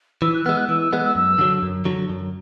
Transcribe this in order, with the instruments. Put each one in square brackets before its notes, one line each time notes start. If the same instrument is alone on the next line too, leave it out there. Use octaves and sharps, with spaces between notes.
[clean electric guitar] E3 [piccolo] E6
[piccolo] F#6
[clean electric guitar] B3 [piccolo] E6
[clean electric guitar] G#3
[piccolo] F#6
[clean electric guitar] E3 [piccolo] E6
[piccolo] E6
[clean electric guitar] G#3 B3 [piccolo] F#6
[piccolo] E6
[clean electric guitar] F#2 [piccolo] E6
[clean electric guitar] D3 F#3
F#2
D3 F#3
F#2